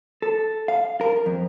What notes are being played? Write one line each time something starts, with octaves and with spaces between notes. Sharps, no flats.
A4
F5
A#4
F2